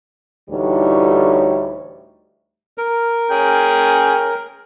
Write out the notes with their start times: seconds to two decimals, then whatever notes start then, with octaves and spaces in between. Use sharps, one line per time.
0.50 D2 A2 E3 G3 D#4 C#5
2.78 A#4
3.30 C#4 G#4 G5